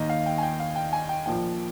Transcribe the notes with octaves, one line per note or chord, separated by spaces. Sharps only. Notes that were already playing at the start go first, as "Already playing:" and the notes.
Already playing: D#2 D#3 A#3 D#5
F5
G5
G#5
G5
F5
G5
G#5
G5
A#1 A#2 F3 A#3 G5